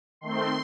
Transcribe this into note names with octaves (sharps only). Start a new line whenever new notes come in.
D#3 A3 C4 C6